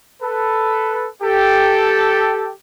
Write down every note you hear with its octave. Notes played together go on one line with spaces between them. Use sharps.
A4 B4
G4 A4